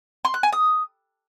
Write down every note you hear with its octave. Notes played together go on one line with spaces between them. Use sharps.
C6
F#6
G#5
D#6